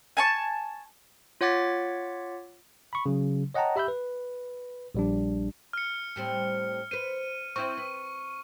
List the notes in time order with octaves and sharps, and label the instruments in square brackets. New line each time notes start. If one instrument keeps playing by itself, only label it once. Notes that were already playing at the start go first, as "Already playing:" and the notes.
[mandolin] G#5 A5 C#6
[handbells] F4 C#5 F#5 D6 A6 B6
[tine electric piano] B5 C#6
C#3 F#3
C#5 D#5 F#5 G5 A5 A#5
G4 E5 B5 E6 G6
B4
A#1 G3 D4
[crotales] F6 C#7
[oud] A2 G3 C4
[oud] B4 C5 [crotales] D#7
[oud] C4 E4 E5 [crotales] C#6
[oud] B4